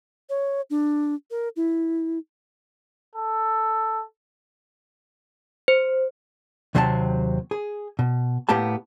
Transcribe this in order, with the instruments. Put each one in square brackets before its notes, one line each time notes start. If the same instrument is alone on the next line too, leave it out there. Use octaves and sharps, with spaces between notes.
[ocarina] C#5
D4
A#4
E4
[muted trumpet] A4
[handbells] C5
[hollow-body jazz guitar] D#2 C3 F#3 C4 G#4 A5
G#4
B2
A2 A#3 B3 G4 A5